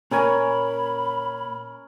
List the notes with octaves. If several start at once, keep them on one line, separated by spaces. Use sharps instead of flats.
A#2 C#4 A#4 C#5 G#5 A#5 B5